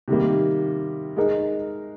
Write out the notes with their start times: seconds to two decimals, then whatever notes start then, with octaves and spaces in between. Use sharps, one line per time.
0.08 C3 D#3 G3 A#3
1.16 G#3 D#4 A#4